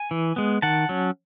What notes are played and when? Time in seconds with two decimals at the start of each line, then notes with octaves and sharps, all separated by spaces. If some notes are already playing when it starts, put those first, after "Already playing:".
Already playing: G#5
0.11 E3
0.36 G#3 B3
0.62 D#3 F#5 A5
0.89 F#3 C#4